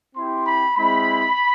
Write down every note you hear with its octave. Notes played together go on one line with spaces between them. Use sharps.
C4 E4 G4 C6
B5
G#3 C4 E4 B5